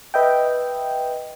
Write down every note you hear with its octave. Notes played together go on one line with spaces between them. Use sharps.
B4 D#5 E5 G5